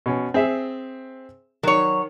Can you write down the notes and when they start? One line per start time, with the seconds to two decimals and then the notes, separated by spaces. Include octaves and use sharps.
0.06 B2 C#4
0.34 C4 G#4 E5
1.63 D#3 F#3 C#5